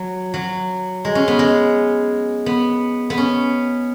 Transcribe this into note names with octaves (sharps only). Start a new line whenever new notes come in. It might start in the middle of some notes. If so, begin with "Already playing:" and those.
Already playing: F#3
F#3
G#3
C#4
B3
G#3
B3
B3
C#4